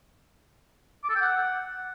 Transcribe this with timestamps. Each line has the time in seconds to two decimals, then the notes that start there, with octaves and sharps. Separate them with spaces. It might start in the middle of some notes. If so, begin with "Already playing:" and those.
1.04 D6
1.10 A4
1.15 G5
1.21 F#5